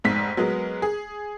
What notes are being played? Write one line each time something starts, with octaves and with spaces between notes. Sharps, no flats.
F1 G#2 B6
F#3 G#3 B3 A#4
G#4